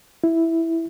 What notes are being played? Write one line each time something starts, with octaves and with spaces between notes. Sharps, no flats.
E4